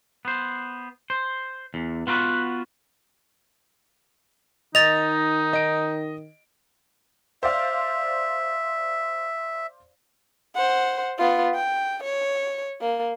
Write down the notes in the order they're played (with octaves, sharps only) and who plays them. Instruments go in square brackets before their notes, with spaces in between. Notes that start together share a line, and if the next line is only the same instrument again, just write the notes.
[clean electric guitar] B3 C5
C5
E2
B3 F4 F#4 A#4 B4
[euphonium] D#3 [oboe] D#4 [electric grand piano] D#5 [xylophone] A6 F7
[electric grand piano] D#5 D7
[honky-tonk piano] C5 D5 F5 [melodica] E5
[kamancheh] C5 F#5
B3 F4
G5
C#5
A#3